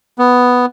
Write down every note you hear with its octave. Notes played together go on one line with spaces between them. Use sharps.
B3